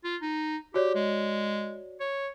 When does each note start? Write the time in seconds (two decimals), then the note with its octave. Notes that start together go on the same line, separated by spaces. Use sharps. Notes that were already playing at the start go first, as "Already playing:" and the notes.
0.04 F4
0.22 D#4
0.74 F#4 G4 C#5 D5
0.95 G#3
2.00 C#5